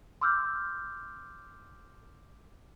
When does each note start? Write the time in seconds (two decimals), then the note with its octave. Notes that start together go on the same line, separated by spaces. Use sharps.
0.21 C6 D6 E6 F6 G6